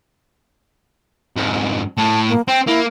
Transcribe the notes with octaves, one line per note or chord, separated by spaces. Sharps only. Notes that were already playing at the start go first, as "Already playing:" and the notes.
F2 G#2
A2 A5
A#3
C4 G5
A#3 E4